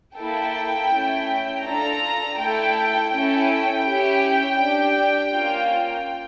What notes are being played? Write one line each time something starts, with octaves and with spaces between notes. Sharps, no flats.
A#3 E4 A4 G5
A3 C#4 E4
D4 F4 A4 A#5
A3 E4 A4 G5
C#4 E4 A4 G5
C#4 E4 G4
D4 G4
A#3 C#4 F4